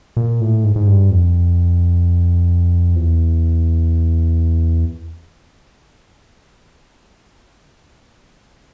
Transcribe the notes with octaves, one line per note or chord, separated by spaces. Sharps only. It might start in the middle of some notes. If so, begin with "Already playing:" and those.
A#2
A2
G#2
G#2
G2
F2
E2